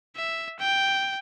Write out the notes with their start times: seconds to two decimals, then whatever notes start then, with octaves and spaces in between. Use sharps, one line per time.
0.16 E5
0.59 G5